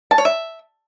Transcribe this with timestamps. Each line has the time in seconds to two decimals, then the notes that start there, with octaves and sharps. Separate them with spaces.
0.11 A5
0.18 C#5
0.25 E5